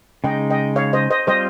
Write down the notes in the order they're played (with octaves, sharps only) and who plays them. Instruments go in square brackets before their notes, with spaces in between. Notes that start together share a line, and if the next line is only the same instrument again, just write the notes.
[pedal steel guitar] C#3 G#3 D#4 [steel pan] D#5 G5
[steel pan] D#5 G5
C#5 F5
C5 D#5
C5 D#5
[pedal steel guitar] G3 C4 F4 [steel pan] C5 D#5